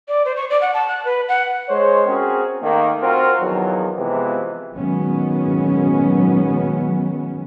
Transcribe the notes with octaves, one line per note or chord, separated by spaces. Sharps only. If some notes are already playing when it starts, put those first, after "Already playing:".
D5
C5
C#6
D5
F#5
A5
F#6
B4
F#5
G#3 C5 C#5
C4 C#4 F#4 G#4 A#4
D#3 A3 A#3
C4 F4 F#4 A#4
E2 D#3 F3 F#3
C3 E3 F3 G#3 B3
A#2 D#3 F#3 G#3 B3 C#4